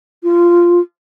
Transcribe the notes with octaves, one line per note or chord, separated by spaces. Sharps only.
F4